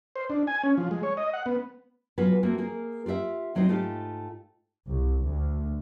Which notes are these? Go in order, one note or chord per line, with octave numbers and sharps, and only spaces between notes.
C5
D4
G#5
C#4
F3
G#3
C#5
D#5
F#5
B3
F#3 B3 F4 F#4 G#4 B4
A3 A#3 C4 F4 F#4
A#3 G#4 A#4
F4 G4 A#4 E5 F#5
D#2 F#3 C4 D#4 C5
G#2 A3 D#4 F4 G4
C2
D2